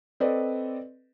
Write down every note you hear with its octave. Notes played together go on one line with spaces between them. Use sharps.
C4 A4 B4 D5 D#5